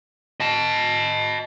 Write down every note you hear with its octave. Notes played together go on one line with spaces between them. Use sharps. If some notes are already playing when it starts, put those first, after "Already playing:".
D#5 A5